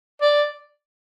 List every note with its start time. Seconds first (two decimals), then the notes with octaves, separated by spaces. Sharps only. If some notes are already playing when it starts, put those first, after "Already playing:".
0.21 D5